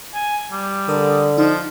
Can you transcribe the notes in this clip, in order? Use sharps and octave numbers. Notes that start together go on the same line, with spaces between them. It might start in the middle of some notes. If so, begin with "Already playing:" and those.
G#5
G3
D3 A#4 D#6
F3 D#4